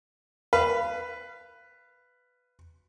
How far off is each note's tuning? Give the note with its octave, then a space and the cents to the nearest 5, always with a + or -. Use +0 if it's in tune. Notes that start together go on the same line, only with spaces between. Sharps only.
B4 +5 F5 -25